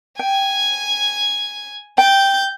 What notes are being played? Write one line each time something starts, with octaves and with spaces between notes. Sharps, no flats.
G5 G#5 G#6
G5 G6 A6